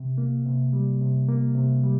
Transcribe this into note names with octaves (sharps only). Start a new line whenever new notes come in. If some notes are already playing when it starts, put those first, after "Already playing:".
Already playing: C3
A#3
C3
G3
C3
A#3
C3
G3